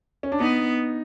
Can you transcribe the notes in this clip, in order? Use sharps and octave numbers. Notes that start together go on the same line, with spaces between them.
C#4
D4
B3 D#4